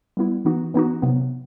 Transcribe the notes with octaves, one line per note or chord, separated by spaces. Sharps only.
G3 B3 E4
E3 B3 D#4 F#4
E3 B3 D#4 F#4
C3 F#3 B3